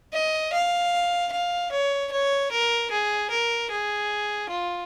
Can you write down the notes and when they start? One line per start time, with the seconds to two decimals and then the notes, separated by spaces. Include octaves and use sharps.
0.13 D#5
0.53 F5
1.32 F5
1.72 C#5
2.12 C#5
2.51 A#4
2.91 G#4
3.31 A#4
3.70 G#4
4.50 F4